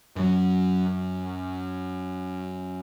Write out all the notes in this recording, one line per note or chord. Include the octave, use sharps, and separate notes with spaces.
F#2 F#3